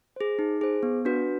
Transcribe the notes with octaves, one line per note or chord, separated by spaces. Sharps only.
G#4 C5
D#4
G#4 C5
B3
D4 F#4 B4